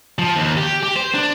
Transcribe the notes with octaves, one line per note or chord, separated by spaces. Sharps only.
F3
D#2
G4
G4
C5
D4